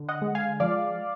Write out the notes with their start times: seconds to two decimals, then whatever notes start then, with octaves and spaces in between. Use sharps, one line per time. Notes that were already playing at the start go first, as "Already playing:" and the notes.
Already playing: D3
0.09 D#5 F#5
0.22 G#3
0.35 F5 G#5
0.60 F3 D5 F5